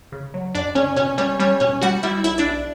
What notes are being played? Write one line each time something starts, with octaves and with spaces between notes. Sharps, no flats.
C#3
F#3
F#2 D4 D5
C#3 C#4 C#5
B2 C#4 C#5
G3 C#4 C#5
G3 C#4 C#5
B2 C#4 C#5
G3 F#4 F#5
G3 E4 E5
B1 E4 E5
D4 D5
B1